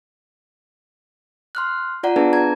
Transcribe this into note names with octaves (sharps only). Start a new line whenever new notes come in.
C6 F6 F#6
F4 D5 F#5 A#5
B3 D4 G#4 B4 A5
A#5 G#6